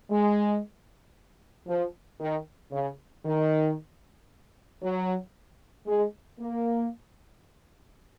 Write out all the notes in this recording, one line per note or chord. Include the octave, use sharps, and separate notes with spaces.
G#3
F3
D#3
C#3
D#3
F#3
G#3
A#3